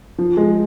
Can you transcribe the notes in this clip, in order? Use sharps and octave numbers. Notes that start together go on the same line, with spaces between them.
F3
G#3